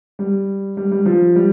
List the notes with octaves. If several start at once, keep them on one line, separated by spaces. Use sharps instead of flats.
G3
G3
G3
F3
G3